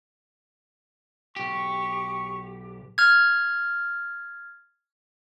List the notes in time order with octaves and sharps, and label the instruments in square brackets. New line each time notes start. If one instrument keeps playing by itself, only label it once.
[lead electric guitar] B1 G4 [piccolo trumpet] C#6
[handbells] F6 G#6